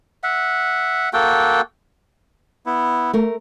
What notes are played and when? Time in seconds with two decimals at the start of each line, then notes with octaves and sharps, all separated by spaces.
0.23 E5 F#5
1.13 A#3 F#4 A4 G5
2.66 B3 E4
3.13 A3 A#4